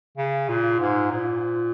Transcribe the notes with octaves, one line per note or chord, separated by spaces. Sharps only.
C#3
A#2
G#2
A#2